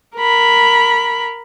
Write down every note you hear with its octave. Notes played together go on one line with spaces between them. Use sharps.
A#4 B5